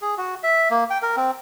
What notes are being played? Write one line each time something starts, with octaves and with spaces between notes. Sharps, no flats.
G#4
F#4
E5
A#3
G5
A#4
C4